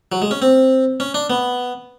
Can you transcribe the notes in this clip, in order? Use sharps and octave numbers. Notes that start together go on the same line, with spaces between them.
F#3
G#3
C#4
C4
C#4
D4
B3